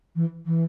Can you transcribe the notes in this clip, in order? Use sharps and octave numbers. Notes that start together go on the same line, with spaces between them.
E3
E3